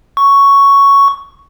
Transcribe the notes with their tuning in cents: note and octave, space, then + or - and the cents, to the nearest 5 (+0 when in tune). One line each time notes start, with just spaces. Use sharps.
C#6 +5